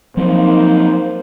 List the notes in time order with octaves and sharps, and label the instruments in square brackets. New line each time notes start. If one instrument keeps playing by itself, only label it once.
[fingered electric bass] F3 F#3 C4 [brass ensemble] A#3 D#4 C5